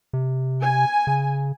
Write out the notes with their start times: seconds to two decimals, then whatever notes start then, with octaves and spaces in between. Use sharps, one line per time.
0.13 C3
0.62 G#5
1.07 C#3